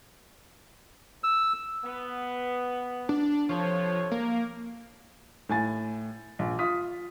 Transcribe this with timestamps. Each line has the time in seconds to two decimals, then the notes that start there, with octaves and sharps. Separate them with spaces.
1.24 E6
1.84 B3
3.09 D4
3.49 C3 F3 A4 C#5
4.11 A#3
5.49 A2 G#5 A6
6.39 A#1
6.59 F4 D#6 B6